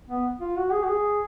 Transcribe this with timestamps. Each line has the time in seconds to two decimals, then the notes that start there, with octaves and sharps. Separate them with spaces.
0.09 B3
0.41 F4
0.57 F#4
0.73 G#4
0.84 F#4
0.88 G#4